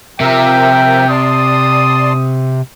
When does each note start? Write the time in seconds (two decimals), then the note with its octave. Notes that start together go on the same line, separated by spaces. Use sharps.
0.20 C3 F3 A#4 E5 G5
1.09 D5 A5 C6 D#6